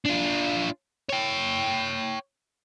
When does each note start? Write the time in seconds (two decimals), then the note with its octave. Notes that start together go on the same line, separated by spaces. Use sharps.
0.05 D4 F4
1.10 C#5 G5